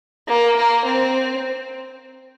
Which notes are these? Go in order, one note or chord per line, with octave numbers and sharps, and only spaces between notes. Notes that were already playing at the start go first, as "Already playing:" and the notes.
A#3
A#3
C4